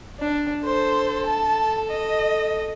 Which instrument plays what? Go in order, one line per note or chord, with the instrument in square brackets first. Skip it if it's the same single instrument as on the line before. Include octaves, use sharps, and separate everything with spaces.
[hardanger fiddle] D4
[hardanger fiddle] A4 [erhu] C5
[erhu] A5
D#5